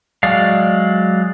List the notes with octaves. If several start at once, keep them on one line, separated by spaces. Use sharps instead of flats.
F#3 G#3 D5 F5